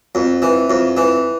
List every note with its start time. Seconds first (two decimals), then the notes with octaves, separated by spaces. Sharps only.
0.15 F2
0.42 E3
0.70 F2
0.97 E3